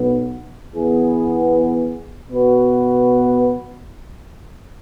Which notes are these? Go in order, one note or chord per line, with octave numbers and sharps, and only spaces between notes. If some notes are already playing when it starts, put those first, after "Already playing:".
Already playing: B1 B2 B3
E2 E3 B3 G#4
B2 B3 F#4 B4